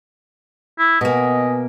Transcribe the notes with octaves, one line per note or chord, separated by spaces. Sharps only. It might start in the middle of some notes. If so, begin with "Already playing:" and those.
E4
B2 A#3 B4 D#5 G#5